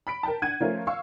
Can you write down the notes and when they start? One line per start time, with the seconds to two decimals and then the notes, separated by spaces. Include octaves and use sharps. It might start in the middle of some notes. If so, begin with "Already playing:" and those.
0.07 B5 B6 D7
0.23 A#4 G5 A5
0.42 D4 F#5 G#6 D#7
0.60 F3 A3 C#4 F4 A#4
0.87 F5 C#6 E6